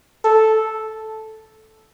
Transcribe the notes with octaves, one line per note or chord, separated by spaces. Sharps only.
A4